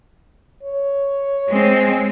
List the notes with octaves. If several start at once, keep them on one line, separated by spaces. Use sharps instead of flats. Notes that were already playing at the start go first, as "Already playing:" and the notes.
C#5
G#3 C4